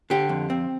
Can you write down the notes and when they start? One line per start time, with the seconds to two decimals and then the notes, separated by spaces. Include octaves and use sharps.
0.10 D3 G4
0.29 F2
0.50 C4